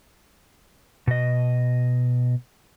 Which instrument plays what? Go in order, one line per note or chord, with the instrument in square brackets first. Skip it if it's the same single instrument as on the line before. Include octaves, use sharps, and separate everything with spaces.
[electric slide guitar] B2 D#5